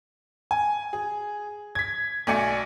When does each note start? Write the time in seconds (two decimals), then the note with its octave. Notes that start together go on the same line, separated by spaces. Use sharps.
0.51 G#5
0.93 G#4
1.75 G#6 B6
2.27 B1 A3 D5 G#5 C#7